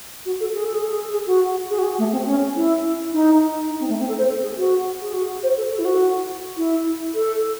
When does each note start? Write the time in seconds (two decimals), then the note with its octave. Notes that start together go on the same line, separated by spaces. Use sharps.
0.26 F#4
0.40 A4
0.54 G#4
0.65 A4
0.74 G#4
0.83 A4
0.92 G#4
1.13 G#4
1.27 F#4
1.70 G#4
1.79 F#4
1.84 G#4
1.98 A3
2.12 C4
2.26 C#4
2.56 E4
3.13 D#4
3.70 D#4
3.80 C4
3.89 A3
4.00 C4
4.09 A4
4.18 C5
4.28 A4
4.42 G#4
4.57 F#4
5.02 G#4
5.13 F#4
5.43 C5
5.57 A4
5.72 A4
5.79 E4
5.85 F#4
6.57 E4
7.15 A4